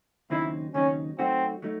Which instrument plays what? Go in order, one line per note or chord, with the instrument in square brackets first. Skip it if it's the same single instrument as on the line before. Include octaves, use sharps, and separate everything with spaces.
[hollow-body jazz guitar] D#2 C#3 F#3 C4 D#4 [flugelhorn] E4
[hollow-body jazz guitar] D#2 C#3 F#3 C4 D#4 [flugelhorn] C#4
[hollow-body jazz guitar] F#3 A3 D#4 F#4 [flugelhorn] C4
[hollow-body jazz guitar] F#3 A3 D#4